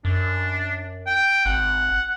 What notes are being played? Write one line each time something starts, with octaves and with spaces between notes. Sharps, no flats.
F#2 D4
G5
G#1 F#5